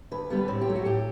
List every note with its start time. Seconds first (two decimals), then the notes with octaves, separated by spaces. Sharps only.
0.11 D2 B4
0.30 D3 G3 B3
0.48 A2 C4
0.61 G4
0.67 F#3 A3
0.76 F#4
0.85 A2 G4